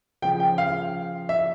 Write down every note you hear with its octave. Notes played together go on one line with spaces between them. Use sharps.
C#3 F3 G5
G5
F5
E5